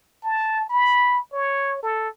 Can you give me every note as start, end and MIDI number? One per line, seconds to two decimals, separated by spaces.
0.23 0.67 81
0.69 1.20 83
1.33 1.82 73
1.83 2.09 69